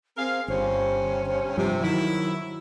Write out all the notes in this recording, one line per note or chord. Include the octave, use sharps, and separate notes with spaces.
C4 G#4 A#4 F5
G1 G2 C3 C#4 C5
C5
G2 C3 F3
D#3 F#3 E4 F#4